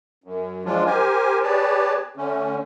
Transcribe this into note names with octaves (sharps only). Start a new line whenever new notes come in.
F#2
F3 F#3 G#3 D4 F4
G4 A#4 C5 G#5
G4 G#4 B4 C#5 D5 A5
D3 A3 C#4